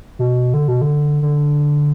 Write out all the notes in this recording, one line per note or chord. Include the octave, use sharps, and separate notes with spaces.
B2
D3
B2
D3
D3